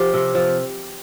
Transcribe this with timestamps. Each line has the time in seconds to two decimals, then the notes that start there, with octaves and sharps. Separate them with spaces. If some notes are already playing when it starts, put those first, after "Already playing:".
Already playing: F3 G4
0.14 C3
0.35 F3